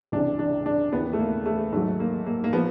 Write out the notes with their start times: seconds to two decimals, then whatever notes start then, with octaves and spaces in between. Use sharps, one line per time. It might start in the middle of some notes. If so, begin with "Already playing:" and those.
0.12 C#2 C3 E3 D4
0.39 D4
0.66 D4
0.93 D#2 C#3 E3 B3
1.13 A3
1.19 A#3
1.46 A3
1.72 G#2 D#3 F#3 A3
2.00 A#3
2.26 A#3
2.44 A#3
2.53 F3 B3